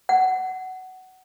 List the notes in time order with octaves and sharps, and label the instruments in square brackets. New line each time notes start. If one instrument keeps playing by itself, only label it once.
[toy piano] F#5